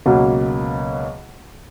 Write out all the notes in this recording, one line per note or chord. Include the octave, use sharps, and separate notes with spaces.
C#2 B2 F#3 A#3